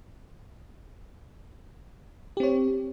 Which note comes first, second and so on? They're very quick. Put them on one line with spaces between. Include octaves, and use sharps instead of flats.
G4 C4 C#5